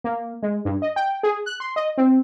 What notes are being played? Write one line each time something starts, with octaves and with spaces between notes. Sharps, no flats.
A#3
G#3
G2
D#5
G5
G#4
F#6
C6
D#5
C4